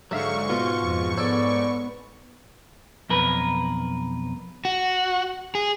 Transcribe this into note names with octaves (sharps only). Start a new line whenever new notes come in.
G#2 D3 F#3 E5 F5 C#6
B2 F4
F2
B3 A4 C#5 D5
B1 F2 A#4 B4
F#4
G#4